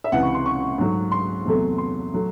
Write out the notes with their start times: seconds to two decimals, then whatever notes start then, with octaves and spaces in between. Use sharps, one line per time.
0.04 E5
0.12 C#2 C3 E3 F#5
0.23 C#6
0.35 C6
0.46 C#6
0.78 G#2 F#3 A3
1.12 C6
1.45 E2 C3 F#3 A3
1.78 C6
2.14 F#3 A3